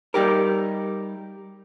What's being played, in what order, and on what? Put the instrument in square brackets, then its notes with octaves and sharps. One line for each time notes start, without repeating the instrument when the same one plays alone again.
[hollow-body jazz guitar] G3 D#4 G4 A#4